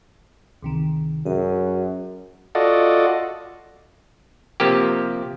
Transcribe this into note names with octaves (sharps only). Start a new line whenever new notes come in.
C#2 C3 D#3
F#2 G#4
F4 F#4 A4 D5 D#5
C3 F3 A#3 G4